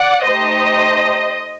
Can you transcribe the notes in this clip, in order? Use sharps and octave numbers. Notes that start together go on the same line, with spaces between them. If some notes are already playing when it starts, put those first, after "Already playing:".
Already playing: D5 F#5
A3 D#4 G4 C5 D#5